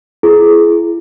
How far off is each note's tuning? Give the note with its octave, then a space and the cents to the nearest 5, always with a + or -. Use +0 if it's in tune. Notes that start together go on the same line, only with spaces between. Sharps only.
E4 +40 G#4 +25